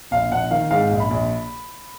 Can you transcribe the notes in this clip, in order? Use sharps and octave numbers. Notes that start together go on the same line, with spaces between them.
A#1 F5
A#1 F#5
D#3 F5
G#2 F5
A#1
B5
A#1